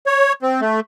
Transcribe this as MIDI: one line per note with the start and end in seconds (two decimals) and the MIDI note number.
0.06 0.33 73
0.42 0.61 60
0.61 0.80 57